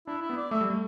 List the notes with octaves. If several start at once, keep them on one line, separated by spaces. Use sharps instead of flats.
D4 E4
E4
B3
D5
A3 E5
G3
A3